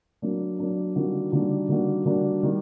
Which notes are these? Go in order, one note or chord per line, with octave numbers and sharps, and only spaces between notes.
F#3 A#3 D4
F#3 A#3 D4
D#3 G3 A#3 D4 F#4
D#3 G3 A#3 D4 F#4
D#3 G3 A#3 D4 F#4
D#3 G3 A#3 D4 F#4
D#3 G3 A#3